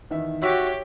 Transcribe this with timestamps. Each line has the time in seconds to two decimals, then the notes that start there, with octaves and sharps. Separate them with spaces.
0.11 E2 D#3 E5
0.42 F#4 G4 C#5 E5 E6 B6